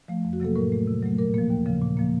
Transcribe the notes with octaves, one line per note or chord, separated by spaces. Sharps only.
F3 A3
F2
F#4
C3 F#3 A#3 A4
A2 A#4
A3
C3
F#3 A3
A#2 A#4
F3 A#3
D#2
C#3 F3
A#2
F3 A#3